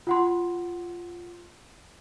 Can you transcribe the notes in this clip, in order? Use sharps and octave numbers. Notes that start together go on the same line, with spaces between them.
F4 F#5 C6